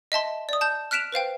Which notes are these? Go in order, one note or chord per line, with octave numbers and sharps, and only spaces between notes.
D#5 E5 A5 C6
D5 D#6
A5 G6
F6 F#6 B6 D7 E7 F7
B4 C5 F5 G5